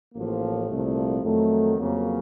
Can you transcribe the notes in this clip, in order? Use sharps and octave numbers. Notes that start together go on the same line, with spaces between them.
A1 A2 F3 A#3
C2 A#2 F3 A3
F2 D#3 F#3 A3
F2 C#3 F#3 A#3